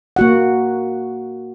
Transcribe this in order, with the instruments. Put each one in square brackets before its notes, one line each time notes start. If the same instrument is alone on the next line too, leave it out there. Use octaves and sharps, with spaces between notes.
[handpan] A#3 F#4 F#5